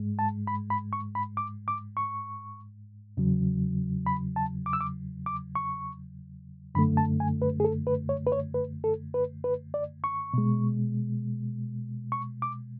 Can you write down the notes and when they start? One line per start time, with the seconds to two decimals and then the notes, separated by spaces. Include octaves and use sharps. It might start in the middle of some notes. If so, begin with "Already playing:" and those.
Already playing: G#2 G#3
0.19 A5
0.47 B5
0.70 B5
0.93 C#6
1.15 B5
1.37 D6
1.68 D6
1.97 C#6
3.17 E2 C#3 F#3
4.06 B5
4.36 A5
4.66 D6
4.73 E6
4.81 D6
5.26 D6
5.55 C#6
6.75 F#2 D3 A3 B5
6.97 A5
7.20 G#5
7.42 B4
7.60 G#4
7.65 A4
7.87 B4
8.09 C#5
8.27 B4
8.32 C#5
8.54 B4
8.84 A4
9.14 B4
9.44 B4
9.74 D5
10.04 C#6
10.34 B2 G#3
12.12 C#6
12.42 D6